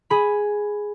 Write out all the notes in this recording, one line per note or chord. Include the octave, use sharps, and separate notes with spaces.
G#4 B5